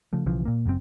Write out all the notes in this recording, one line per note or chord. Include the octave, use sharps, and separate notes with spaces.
C#3 F3 A3
B1 C#3 E3 F3
A#2 A#3
F#1 F#2 B2 C4